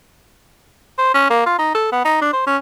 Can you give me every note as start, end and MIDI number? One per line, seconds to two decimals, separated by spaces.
0.98 1.14 72
1.14 1.26 61
1.30 1.43 58
1.46 1.57 65
1.59 1.72 63
1.75 1.91 69
1.92 2.00 59
2.05 2.17 63
2.21 2.31 62
2.33 2.45 72
2.47 2.57 61